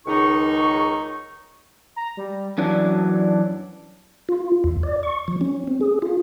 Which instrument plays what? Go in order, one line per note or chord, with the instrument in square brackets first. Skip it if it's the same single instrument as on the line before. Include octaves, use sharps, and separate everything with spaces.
[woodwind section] C#2 D#3 D#4 C#6
[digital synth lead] A#5
G3
[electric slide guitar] F#2 E3 F#3 [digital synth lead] D4
[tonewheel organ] F4
E2
D5
C#6
F3
C#4
C4
G#4
F4